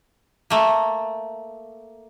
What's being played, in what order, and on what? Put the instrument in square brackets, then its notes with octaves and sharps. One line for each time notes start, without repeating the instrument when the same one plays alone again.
[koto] A3 A#3